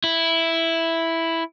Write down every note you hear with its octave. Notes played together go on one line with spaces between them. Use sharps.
E4